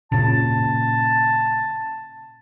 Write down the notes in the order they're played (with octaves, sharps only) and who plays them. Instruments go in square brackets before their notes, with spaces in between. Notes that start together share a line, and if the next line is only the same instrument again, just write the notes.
[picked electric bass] A#2 C#3 [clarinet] A5